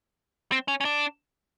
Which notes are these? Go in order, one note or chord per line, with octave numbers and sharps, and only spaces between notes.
C4
C#4
C#4
D4